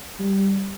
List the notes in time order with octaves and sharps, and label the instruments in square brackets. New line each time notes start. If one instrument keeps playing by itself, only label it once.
[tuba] G3